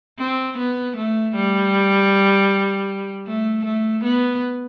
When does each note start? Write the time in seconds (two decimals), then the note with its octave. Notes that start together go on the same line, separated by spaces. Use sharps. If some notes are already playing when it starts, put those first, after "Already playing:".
0.19 C4
0.57 B3
0.96 A3
1.35 G3
3.27 A3
3.65 A3
4.04 B3